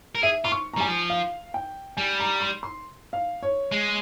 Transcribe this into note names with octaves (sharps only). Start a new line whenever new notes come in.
A#4
G#4 E5
F4 C6
C#6
A#5
G3 G#5
F3
F5
G5
G3 G#5
A#5
C6
C6
F5
C#5
G#3